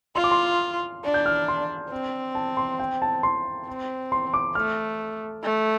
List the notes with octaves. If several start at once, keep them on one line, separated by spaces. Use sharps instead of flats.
F4 C6
D6
C6
D4
G6
F6
C6
C4
A5
C6
G5
A5
C6
C4
C6
D6
A3 F6
A3